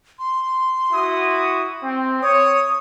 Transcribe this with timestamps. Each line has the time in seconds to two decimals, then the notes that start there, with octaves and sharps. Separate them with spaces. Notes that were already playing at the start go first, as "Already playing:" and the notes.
0.19 C6
0.92 E4 F#4 D#6
1.82 C4
2.22 C#5 D#6